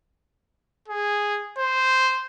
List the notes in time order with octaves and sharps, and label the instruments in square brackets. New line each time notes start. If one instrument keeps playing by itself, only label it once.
[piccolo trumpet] G#4
C5